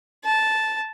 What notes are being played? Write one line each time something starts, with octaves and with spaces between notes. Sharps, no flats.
A5